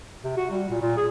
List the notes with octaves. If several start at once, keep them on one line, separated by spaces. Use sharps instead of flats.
C3
F#4
G3
A#2
A#2
G#4